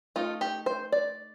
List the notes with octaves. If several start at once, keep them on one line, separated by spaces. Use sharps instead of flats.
A3 D#4 F4
G4
C5
D5